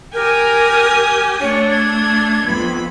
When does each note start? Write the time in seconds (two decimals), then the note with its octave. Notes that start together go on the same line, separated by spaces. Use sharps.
0.14 G4 A#4 G#5 D#6
1.41 A3 D4 C#5
1.71 G#6
2.45 F2 B3 B5